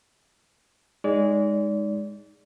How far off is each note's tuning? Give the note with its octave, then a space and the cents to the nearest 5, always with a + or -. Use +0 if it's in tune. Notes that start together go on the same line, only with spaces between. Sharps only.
G#3 -10 D#4 +0 D5 -35